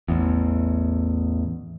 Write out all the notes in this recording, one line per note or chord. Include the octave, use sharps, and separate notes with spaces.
A1 E2